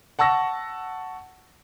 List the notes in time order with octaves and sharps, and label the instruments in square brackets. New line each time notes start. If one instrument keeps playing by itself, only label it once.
[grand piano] F#5 A5 C#6 E6 A#6